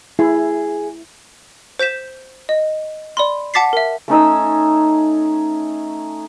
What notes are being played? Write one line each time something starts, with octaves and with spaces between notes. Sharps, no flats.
E4 G#4
C5 G6 B6 E7
D#5
D5 B5 C6
F#5 A5 D6 A6 B6 C7
A#4 E5
A3 C#4 D#4 E6